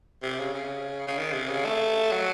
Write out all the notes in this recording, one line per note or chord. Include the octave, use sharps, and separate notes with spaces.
C3
C#3
C#3
C#3
D#3
C3
C#3
A3
F#3